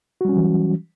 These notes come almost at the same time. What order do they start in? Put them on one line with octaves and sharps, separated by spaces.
F#4 G3 C#4 F#3 E3